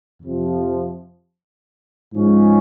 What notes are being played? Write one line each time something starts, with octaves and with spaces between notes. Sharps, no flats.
F2 C3 F3
G#2 F3 G#3 C#4